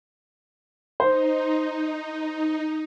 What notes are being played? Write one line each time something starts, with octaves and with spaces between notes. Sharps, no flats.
D#4 C5